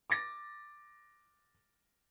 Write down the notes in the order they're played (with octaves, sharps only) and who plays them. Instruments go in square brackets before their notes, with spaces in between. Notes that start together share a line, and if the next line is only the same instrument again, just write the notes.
[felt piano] D6 A6 A#6